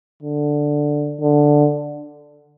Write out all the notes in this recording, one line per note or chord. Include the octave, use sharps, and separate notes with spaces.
D3
D3